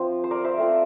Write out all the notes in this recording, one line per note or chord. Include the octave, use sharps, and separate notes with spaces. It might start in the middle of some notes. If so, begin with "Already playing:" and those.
Already playing: F3 C4 F4
C5
A#4 D5
C5 E5
A3 C4 F4